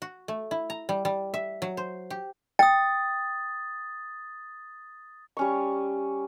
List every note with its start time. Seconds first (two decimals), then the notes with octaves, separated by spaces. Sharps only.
0.02 F#4
0.28 A3
0.51 E4
0.70 A#5
0.89 G3
1.05 G3
1.34 E5
1.62 F#3
1.77 C5
2.10 G4
2.59 G5 D#6 A6
5.37 G3 C#4 C#6